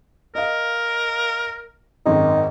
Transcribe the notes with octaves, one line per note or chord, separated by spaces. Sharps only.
A#4 D#5 F5
G#1 F#2 D#3 D#4